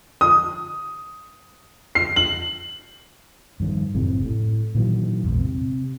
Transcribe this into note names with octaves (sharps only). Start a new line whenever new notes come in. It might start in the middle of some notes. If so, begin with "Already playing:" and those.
D#6
C7
F#7
G2 D#3 F3
F#1 F2 A2 C3
A2
A#2 D#3 E3 F#3
A#1 E2 G#2
C3